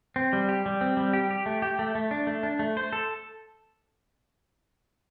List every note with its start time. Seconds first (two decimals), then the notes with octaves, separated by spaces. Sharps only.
0.16 C4
0.33 G3
0.49 G4
0.66 G3
0.81 C4
0.97 G3
1.13 G4
1.31 G4
1.46 A3
1.62 G4
1.79 A3
1.95 A3
2.11 D4
2.27 A3
2.43 D4
2.59 A3
2.77 C5
2.93 A4